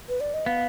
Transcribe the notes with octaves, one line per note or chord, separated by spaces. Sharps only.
B4
D5
D#5
B3 F5